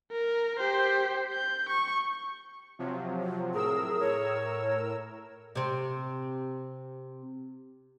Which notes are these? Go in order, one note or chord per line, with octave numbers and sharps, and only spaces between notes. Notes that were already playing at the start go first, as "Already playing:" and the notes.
A#4
G4 C5
G6
C#6
C3 F3 F#3
A2 G#4 A#4 E6
C#5
C3 C4